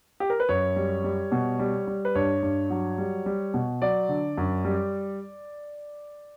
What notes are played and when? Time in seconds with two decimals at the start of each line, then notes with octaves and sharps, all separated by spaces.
0.20 G4
0.30 A#4
0.40 B4
0.49 F#2 C#5
0.76 G3
1.04 G3
1.32 B2
1.59 G3
1.87 G3
2.05 B4
2.15 G2 C#5
2.43 G2
2.70 F#3
2.98 G3
3.26 G3
3.54 B2
3.82 F#3 D5
4.09 D3
4.37 F#2
4.65 G3